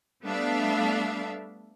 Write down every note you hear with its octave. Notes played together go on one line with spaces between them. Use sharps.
G3 A3 B3 D4 E5 F5